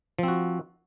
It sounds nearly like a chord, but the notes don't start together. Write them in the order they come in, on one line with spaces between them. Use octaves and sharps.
F3 C4 F#4